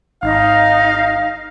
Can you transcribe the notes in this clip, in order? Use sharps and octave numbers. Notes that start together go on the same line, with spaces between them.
G#1 D#4 F5